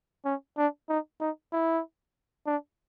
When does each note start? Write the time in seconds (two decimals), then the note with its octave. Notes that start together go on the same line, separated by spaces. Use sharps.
0.25 C#4
0.58 D4
0.89 D#4
1.20 D#4
1.53 E4
2.47 D4